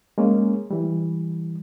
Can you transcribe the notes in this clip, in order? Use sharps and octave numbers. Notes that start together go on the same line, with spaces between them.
G#3 A#3 C#4
E3 G3